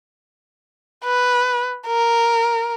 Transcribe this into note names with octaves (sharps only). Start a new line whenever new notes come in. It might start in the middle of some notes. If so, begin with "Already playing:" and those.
B4
A#4